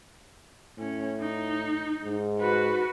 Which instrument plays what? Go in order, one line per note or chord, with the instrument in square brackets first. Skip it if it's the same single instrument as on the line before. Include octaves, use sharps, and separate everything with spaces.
[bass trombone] A2 [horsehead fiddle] C#4
[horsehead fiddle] D#4
[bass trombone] G#2
[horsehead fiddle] F#4 B4